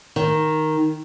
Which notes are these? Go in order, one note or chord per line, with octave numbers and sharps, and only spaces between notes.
D#3